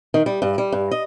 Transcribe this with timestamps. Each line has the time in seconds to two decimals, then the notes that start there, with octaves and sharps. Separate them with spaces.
0.14 D#3
0.26 G3
0.42 G2
0.58 G3
0.72 G2
0.91 D#5